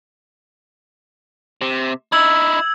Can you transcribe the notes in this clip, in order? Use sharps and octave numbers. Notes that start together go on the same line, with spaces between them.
C3
D#4 E4 E6 G#6 F#7